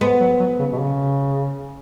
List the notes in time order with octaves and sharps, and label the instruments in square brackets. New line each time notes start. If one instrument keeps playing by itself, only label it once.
[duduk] G#3 [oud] B3
[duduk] F#3
F#3
C#3
B2
C#3